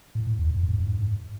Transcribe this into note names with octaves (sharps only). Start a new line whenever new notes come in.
A2
A2
E2
F2
F#2
G#2
G2
G#2